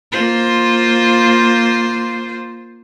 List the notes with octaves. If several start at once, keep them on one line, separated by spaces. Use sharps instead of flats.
A#3 F4 C5